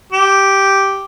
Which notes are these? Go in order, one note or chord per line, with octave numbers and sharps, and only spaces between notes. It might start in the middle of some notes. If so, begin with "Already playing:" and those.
G4